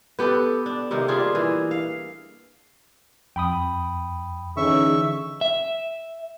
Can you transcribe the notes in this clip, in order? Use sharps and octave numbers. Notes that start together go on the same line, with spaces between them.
B3 G4 A4 B4
D4
C3 D#3 A#3
G3 D4 F4 G#4
E3
F5
F2 G5 B5 D#6
D3 E3 C#4 D#4 G#4 E5 C#6
E5